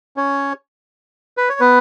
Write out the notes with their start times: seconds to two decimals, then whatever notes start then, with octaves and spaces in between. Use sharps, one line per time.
0.17 C#4 C#5
1.37 B4
1.49 C#5
1.60 B3 B4